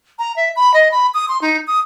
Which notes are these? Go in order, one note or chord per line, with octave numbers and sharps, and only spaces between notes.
A#5
E5
B5
D#5
B5
D#6
C6
D#4
D#6